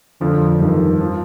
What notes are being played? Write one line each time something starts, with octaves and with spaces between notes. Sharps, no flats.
F2 D3 F3
G2 D#3 G3
F3